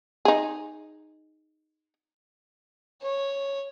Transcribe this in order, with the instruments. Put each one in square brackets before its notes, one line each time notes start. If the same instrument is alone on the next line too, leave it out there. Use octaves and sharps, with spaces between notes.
[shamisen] D#4 G#4
[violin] C#5